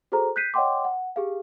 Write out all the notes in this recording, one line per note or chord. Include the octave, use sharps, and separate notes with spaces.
F#4 G#4 A4 C5 A#5
F#6 G6 B6 C7 D#7
C#5 D#5 F#5 G5 C6 D6
F#5
G4 G#4 F5